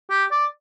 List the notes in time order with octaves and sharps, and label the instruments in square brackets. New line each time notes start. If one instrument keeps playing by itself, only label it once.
[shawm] G4
D5